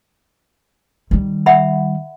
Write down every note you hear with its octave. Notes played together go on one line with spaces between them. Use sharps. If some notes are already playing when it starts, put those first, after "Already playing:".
D#3 G3
E5 F#5 B5